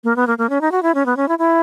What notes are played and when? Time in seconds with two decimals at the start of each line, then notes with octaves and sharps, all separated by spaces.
0.04 A#3
0.16 B3
0.27 A#3
0.38 A#3
0.50 C#4
0.61 D#4
0.72 F#4
0.83 E4
0.95 C#4
1.06 B3
1.17 C#4
1.28 E4
1.39 E4